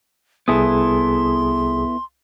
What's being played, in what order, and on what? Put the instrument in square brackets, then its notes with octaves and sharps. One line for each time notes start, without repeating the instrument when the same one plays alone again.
[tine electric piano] C2 G#4 D#6 [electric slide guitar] B3 E4 A4 [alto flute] C6